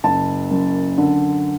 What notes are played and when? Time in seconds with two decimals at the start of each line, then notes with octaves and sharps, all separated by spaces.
0.04 F#1 A5
0.51 F#2
0.98 D3